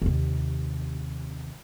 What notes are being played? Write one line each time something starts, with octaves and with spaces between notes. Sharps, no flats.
D#2 C3